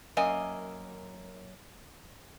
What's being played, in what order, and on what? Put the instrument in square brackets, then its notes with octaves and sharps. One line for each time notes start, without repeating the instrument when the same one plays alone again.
[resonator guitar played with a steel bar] F#2 A#3 D#5 G#5